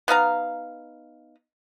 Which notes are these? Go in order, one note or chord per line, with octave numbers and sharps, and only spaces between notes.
B3 D#4 F5 A#5